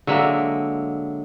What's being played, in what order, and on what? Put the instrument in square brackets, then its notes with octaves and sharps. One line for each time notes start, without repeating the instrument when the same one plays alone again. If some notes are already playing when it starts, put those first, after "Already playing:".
[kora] D3 A#3 [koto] F#3 G#3 E5